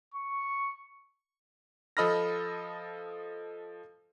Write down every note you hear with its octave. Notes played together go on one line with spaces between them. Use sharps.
C#6
F3 A4 D#5 B5 F6 A#6